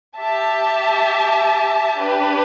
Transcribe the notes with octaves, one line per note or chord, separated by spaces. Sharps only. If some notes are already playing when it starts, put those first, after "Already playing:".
G4 E5 A5
D4 G4 B4